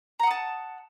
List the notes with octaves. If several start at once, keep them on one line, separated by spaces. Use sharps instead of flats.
F#5 A5 A#5 D#6